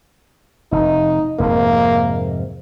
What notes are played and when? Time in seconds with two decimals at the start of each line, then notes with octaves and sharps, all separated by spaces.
0.72 F1 D#4
1.40 F1 F2 G#2 A#3